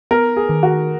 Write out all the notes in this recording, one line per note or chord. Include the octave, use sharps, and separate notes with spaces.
B3 A#4
G#4
D#3
F#4